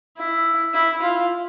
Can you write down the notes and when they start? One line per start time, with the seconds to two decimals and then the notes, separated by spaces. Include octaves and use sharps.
0.17 E4
0.74 E4
1.02 F4